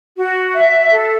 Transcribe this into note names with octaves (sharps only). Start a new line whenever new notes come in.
F#4
E5
A4